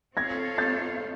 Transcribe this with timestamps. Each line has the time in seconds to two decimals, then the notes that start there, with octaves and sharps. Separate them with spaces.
0.17 C4 F4 A4 C#5 F5 G#6 A#6
0.58 G6 A6